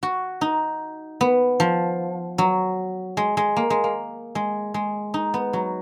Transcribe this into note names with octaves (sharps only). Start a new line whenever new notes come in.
F#4
D#4
B3
F3
F#3
G#3
G#3
A#3
G#3
A#3
G#3
G#3
D#4
B3
F#3